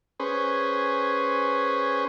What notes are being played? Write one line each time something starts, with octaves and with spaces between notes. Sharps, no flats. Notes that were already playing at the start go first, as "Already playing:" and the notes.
C#4 G#4 B4 C5